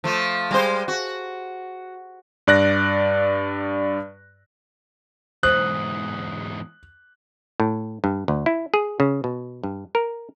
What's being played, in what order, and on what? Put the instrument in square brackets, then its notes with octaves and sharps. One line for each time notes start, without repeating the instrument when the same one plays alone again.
[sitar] F3 A3
G3 G#3 C5
F#4
[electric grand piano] G2 D5 F#6 A#6
[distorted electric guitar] E2 G#2 [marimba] C5 [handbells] D#6 [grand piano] F#6
[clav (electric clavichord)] A2
G2
D2
E4
G#4
C#3
B2
G2
A#4